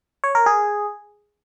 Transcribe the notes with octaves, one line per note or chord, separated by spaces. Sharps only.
C#5
A#4
G#4